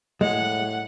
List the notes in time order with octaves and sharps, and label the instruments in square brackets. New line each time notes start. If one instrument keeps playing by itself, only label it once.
[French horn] A2 [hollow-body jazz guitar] G#3 [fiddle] F#5